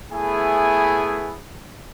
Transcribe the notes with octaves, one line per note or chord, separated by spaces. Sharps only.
A3 B3 E4 G#4 G#5